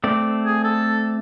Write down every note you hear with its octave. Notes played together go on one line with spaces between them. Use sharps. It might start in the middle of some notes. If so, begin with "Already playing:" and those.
A3 C4 D5
G#4
A4